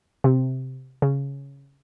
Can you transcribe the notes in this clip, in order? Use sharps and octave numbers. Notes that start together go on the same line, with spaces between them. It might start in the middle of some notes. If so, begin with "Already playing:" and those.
C3
C#3